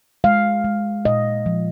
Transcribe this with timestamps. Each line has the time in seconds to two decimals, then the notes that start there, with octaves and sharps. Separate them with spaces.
0.24 G#3 F5
0.64 G#3
1.05 A#2 D#5
1.46 F3